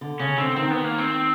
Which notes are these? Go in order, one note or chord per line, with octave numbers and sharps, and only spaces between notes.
D3
C#3 C#4
D3 C4
D#3 C4
B3
A#3
C4